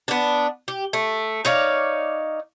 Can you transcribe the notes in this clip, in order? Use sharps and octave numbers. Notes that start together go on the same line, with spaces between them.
B3 D4
G4
A3
D#4 C#5 D5 F5